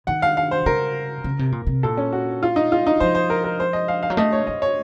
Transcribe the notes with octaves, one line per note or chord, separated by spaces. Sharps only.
D#3 F#5
F5
F5
C5
C#3 A#4
C#3
C3
A#2
C3
A#2 A4
C#4
F#4
F4
D#4
F4
D#4
F3 C5
C5
A#4
A#4
C5
D#5
F5
F5
F#3
A3 D#5
C#5
A3 D#5
C#5